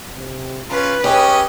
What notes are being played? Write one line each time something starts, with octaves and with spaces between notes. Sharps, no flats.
C3
C#3 C#4 F4 B4
C#4 G4 G#4 C#5 D#5